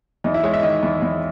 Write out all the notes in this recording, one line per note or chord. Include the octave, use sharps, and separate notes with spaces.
E2 D#4
E4
G#3 C#5
E5
D#3 D#5
E2
E2